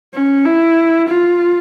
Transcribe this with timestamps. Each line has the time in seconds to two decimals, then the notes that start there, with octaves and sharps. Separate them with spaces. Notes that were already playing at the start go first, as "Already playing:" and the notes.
0.14 C#4
0.45 E4
1.09 F4